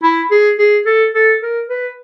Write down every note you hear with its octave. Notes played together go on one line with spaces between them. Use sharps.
E4
G#4
G#4
A4
A4
A#4
B4